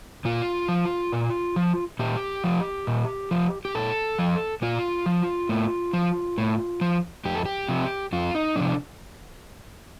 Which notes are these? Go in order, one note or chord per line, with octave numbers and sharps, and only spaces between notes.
A#2 F4
F3
A#2
F3
A#2 G4
F3
A#2
F3
G4
A#2 A4
F3
A#2 F4
F3
A2
F3
A2
F3
F2 G4
A4
G4
C3 F3
F2 F4
D#4
C3 F3 D4